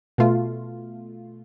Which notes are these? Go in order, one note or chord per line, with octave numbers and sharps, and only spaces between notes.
B2 A3 F4